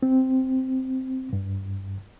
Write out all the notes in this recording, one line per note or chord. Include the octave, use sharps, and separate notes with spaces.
C4
G2